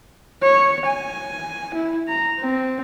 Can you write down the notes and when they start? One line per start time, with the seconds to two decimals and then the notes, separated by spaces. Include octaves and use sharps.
0.42 C#5
0.87 G#5
1.75 E4
2.08 A#5
2.40 C4